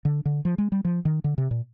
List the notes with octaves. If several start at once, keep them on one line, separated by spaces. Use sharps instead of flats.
D3
D3
F3
G#3
G3
F3
D#3
D3
C3
A#2